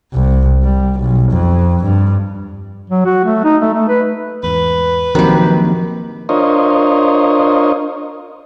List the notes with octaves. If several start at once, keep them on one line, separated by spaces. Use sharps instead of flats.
C2
G3
B1
F2
G2
F#3
F#4
A3
D#4
A3
A3
B4
E2 G#2 B4
D#3 F3 F#3 A#3 C4 F#4 G4
D4 F4 A#4 C5 C#5 D#5